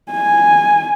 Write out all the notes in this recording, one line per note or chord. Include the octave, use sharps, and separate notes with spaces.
G#5